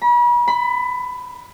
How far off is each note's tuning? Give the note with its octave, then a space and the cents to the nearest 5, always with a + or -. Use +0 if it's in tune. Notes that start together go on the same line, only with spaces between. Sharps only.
B5 -40
B5 +20